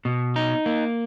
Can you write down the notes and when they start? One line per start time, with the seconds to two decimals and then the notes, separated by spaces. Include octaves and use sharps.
0.05 B2
0.36 D#4
0.66 A#3